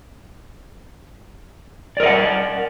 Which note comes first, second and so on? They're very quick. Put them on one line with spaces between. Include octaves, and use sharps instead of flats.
D5 A#4 D#5 F#5